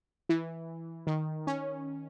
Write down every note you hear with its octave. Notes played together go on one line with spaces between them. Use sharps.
E3
D#3
C#4